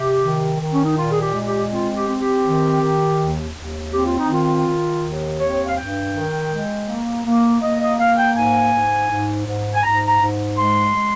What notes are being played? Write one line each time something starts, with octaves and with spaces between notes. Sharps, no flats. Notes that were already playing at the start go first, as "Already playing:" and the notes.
Already playing: C3 G4
D#3
D#3
C#4
D#4
A#2 F4
G#4
G4
G#3
G4
C4 F4
G4
C4
G4
D#3
D#3
D#2
D#2
C4 G4
F4
D#4
D#3 F4
D#3
D#2
C4 C#5
F5
G2 G5
D#3
G#3
A#3
A#3
A#3 D#5
D#5
A#3 F5
G5
G#2 G#5
G#2
G#2
G#2
G#5
G#2 A#5
A#5
G#2
G#3 C6
G#3